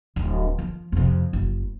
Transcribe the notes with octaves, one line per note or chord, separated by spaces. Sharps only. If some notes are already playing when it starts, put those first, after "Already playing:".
D1
F3
F2 C3
F#1